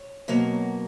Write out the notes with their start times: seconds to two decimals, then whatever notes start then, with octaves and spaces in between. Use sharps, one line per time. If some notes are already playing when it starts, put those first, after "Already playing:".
Already playing: C#5
0.28 B2 F#3 A#3